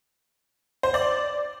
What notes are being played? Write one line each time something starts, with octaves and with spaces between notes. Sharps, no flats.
C5
D5